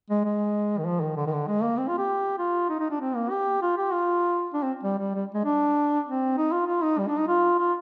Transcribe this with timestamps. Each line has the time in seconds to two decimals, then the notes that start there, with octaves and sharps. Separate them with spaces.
0.10 G#3
0.24 G#3
0.79 D#3
0.86 F3
1.01 D#3
1.16 D3
1.26 D#3
1.32 D3
1.47 G#3
1.62 A#3
1.77 C4
1.88 F4
1.98 G4
2.38 F4
2.69 D#4
2.79 D#4
2.90 D4
3.01 C4
3.15 A#3
3.30 G4
3.62 F4
3.77 G4
3.92 F4
4.54 D4
4.63 C4
4.83 G3
4.99 G3
5.15 G3
5.34 G#3
5.45 D4
6.07 C4
6.37 D#4
6.52 F4
6.67 F4
6.82 D#4
6.98 G3
7.07 D4
7.18 D#4
7.28 F4
7.59 F4